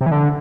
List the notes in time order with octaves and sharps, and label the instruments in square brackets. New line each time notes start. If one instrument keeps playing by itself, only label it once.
[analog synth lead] C3
E3
D3